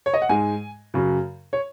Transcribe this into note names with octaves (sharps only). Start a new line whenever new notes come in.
C#5
D#5
F#5
G#2 G#3 G#5
F#2 C#3 F#3
C#5